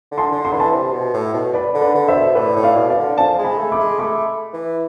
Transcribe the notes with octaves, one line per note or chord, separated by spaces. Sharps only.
D3
A5 C6
D3
C6
E3 B5
A5 C6
C3
B2
A2
B2
B4 D5
D3
B4 D5
D3
C5 E5
B2
A2 B4 D5
A2
D5 F5
B2
D5 F5
D3
F3 F5 A5
G#3
G#5 B5
A3
B5 D6
G#3
A3 B5 D6
E3